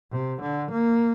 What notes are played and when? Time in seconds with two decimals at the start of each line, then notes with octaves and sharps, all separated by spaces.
0.12 C3
0.42 D3
0.71 A#3